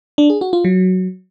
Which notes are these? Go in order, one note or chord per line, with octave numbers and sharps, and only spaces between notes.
D4
G#4
F#4
F4
F#3